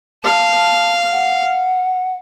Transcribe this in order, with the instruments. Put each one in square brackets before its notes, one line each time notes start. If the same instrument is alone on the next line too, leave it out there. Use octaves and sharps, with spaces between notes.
[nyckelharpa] F5 [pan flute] A5
[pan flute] F#5